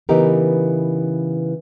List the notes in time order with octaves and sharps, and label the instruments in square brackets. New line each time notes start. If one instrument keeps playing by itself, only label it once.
[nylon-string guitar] C#3 E3 B3 D#4 G4 A#4